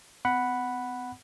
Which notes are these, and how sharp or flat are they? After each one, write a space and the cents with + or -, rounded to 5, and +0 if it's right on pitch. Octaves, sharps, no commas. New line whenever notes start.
B3 +45 F#5 +0 B5 +0